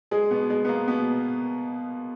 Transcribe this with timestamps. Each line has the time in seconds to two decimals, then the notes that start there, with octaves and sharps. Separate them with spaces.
0.11 G#3 G#4
0.31 B2 B3
0.50 G#3
0.65 B3
0.69 A#3
0.87 B2 B3